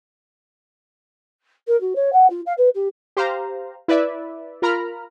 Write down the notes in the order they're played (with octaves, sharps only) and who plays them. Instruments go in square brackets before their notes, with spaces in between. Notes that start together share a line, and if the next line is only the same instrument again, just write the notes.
[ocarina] A#4
F#4
C#5
F#5
F4
F5
B4
G4
[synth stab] G4 C5 F5 A#5
E4 B4 D5 E5
F4 A#4 A#5 B5 F6